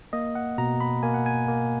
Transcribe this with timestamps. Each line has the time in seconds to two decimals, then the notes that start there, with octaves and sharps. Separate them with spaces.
0.13 A#3 D#5
0.35 F#5
0.58 B2 A#5
0.80 B5
1.03 A#3 G#5
1.14 F#5
1.26 G#5
1.48 A#3